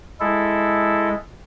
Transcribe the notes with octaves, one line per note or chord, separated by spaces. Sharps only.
G#3 E4 A4